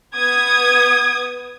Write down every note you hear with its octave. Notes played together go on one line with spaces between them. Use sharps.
B3 D#6 G#6